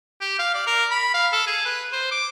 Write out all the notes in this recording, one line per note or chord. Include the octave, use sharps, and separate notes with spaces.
G4
F5
D5
A#4
B5
F5
A4
G#4
B4
C5
D6